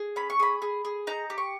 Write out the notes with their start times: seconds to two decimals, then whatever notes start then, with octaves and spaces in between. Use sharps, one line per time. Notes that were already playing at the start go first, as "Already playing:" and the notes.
Already playing: G#4
0.16 C#4 B5
0.30 C#6
0.39 G#4 B5
0.62 G#4
0.85 G#4
1.07 D#4 A#5
1.30 G4
1.38 C#6